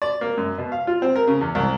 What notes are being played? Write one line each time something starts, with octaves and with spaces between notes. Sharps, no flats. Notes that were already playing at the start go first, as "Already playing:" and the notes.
D5
A#3
F#2
B2
F5
F4
C4
A#4
C#3
E2
C2